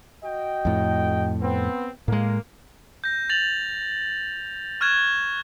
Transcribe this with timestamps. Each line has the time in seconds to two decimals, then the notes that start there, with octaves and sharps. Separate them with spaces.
0.23 F#4 D#5 G5
0.65 F2 A2
1.41 B3 C4
2.08 A2 G#3 A#3
3.04 G6 A#6
3.30 A6 F7 F#7
4.81 C#6 F6 F#6 G#6 E7